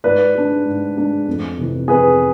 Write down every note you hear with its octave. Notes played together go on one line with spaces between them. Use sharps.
G#2 B4 D5
G#3 D4
G#2
G#3 D4
F2
C3 E3
F2 G#4 B4